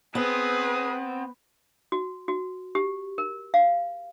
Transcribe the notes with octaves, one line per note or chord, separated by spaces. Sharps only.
B3 C4 G#4 B4 D#6
F#4
F#4
G4
A#4
F5